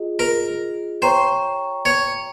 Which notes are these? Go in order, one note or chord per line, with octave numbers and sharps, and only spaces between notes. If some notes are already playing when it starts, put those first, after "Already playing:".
Already playing: F4 G#4 D#5
A#4
C5 C#5 G5 A#5 C#6
C#5